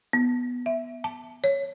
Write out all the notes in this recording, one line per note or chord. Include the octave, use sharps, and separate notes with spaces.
B3
E5
A5
C#5